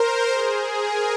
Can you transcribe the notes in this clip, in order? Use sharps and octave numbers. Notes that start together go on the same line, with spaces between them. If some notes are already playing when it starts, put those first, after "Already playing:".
Already playing: A#4 C5
G#4
A#4